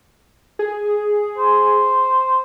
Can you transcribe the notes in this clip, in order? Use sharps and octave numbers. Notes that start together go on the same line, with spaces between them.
G#4
C5